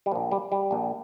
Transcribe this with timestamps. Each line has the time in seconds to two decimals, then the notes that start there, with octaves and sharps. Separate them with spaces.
0.06 G3
0.12 A#2 F3
0.15 A#1
0.32 G3
0.52 G3
0.71 A#1 A#2